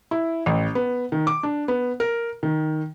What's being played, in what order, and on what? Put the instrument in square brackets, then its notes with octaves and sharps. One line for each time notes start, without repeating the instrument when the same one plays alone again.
[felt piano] E4
A1
B3
D#3
D6
D4
B3
A#4
D#3